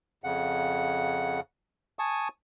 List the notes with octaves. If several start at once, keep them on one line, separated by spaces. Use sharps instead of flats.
F2 C#3 F#5
G#5 A5 C#6 D#6